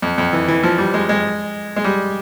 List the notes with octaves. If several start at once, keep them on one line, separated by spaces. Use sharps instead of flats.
F2
F2
E3
E3
F3
G3
G#3
G#3
G#3
G3